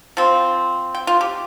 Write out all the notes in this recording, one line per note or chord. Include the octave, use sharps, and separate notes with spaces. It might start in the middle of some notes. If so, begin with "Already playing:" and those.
F3 C4
G5
F4
G4